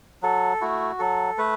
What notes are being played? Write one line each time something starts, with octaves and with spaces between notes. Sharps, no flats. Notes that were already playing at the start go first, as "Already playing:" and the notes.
F#3 A4
A3 E4 F#4
F#3 A4
A3 B4